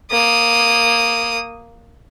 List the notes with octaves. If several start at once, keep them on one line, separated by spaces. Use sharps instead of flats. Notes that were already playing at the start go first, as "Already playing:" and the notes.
A#3 D#6